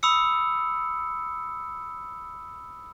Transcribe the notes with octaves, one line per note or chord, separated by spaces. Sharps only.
B5 D#6 E6 C#7